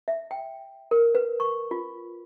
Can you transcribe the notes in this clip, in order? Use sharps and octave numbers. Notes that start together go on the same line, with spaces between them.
E5
G5
A#4
B4
C#6
F4